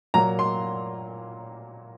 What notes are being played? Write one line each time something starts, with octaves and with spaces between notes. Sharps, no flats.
A#2 F#3 A#3 A#5
C6